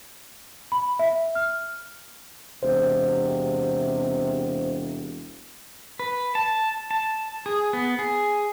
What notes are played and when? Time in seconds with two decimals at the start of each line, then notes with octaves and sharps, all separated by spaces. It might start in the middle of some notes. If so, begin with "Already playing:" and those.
0.72 B5
0.99 E5
1.35 F6
2.63 E1 C3 C5
5.99 B4
6.35 A5
6.91 A5
7.46 G#4
7.73 B3
7.99 G#4